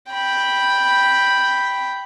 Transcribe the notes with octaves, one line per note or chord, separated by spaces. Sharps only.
G5 B5